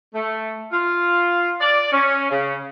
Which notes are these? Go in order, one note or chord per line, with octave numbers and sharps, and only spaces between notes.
A3
F4
D5
C#4
C#3